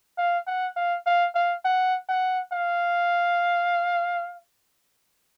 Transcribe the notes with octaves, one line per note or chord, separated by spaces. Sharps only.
F5
F#5
F5
F5
F5
F#5
F#5
F5